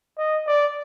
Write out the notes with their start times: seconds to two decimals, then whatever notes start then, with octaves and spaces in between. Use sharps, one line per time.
0.18 D#5
0.47 D5